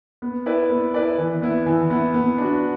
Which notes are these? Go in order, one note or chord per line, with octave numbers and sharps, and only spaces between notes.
B3
E4 B4 D5
B3
E4 B4 D5
E3
B3 E4
E3
B3 E4
B3
D4 F#4